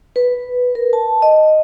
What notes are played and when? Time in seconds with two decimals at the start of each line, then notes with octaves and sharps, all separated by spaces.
0.16 B4
0.75 A#4
0.93 A5
1.22 D#5